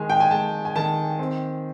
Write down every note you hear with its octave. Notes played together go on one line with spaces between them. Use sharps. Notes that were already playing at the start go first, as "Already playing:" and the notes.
Already playing: D#3 G#3 G#5
G5
G#5
G#3 A5
G#5
D#3 A5
C4